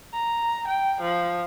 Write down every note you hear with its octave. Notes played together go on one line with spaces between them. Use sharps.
A#5
G5
F3